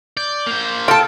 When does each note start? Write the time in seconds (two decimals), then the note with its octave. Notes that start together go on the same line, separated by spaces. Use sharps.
0.17 D5 G6
0.47 A#3 C5
0.88 F4 A4 G5 A5